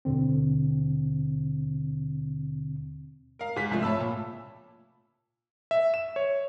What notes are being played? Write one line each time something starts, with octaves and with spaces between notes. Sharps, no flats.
D#2 B2 D3 C4
A#4 F5
G#2 B6
C2 F3 A3
C#5 E5 A5 B5 E6
A#2
E5
E7
C#5